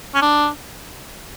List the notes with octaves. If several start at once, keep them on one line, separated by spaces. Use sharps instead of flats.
C#4
D4